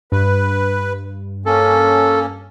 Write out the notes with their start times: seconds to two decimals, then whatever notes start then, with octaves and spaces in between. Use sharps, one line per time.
0.12 G2 B4
1.46 A#3 C#4 A4